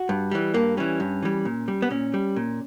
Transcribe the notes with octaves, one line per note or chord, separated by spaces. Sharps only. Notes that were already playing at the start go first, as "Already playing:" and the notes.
Already playing: F#4
G2
E3 G3
G2 A#3
E3 G3 C#4
G2
E3 G3
A#2
G3
B3
A#2 C#4
G3
A#2